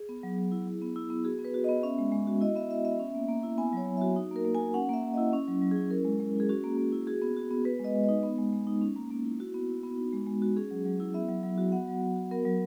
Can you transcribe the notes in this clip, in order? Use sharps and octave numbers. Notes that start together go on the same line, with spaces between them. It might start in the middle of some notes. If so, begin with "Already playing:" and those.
Already playing: G#4
B3
F#3
F#3
E4
E4
B3
E4
B3
F#4 G#4
B3
B4
F#4
B3 D#5
C#4 E5
G#3
G#3
F#4
E4 D#5
B3 E5
E4 E5
B3 E5
C#4
A#3
A#3
E4
B3 G#5
F#3 C#5
F#3
F#4 E5
D#4
A#3
A#4
A#3
G#5
F#4
C#4 F#5
A#3 E5
A#3
E4 D#5
C#4
F#3
F#3
E4 G#4
C#4 A#4
G#3
G#3
E4
G#4
C#4 F#4
A#3
A#3
E4
F#4 G#4
B3
F#4
B3
B3 B4
G#3 D#5
G#3
D#4 D#5
B3
G#3
G#3
D#4
C#4
A#3
A#3
E4
E4 F#4
B3
E4
B3
D#4
G#3
G#3
F#4
C#4 G#4
F#3
F#3
E4
B3 E5
F#3
F#3
F#4
B3 F#5
F#3
F#3
F#4
B3 A#4
F#3